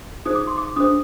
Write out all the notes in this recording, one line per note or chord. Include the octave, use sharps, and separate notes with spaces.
D#4 G#4 C5 D#6
D6
C6
D6
D4 G#4 C5 D#6